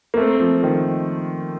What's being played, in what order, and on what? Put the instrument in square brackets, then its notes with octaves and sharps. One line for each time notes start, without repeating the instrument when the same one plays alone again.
[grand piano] A#3
[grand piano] A3 [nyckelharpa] C4
[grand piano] F3
D#3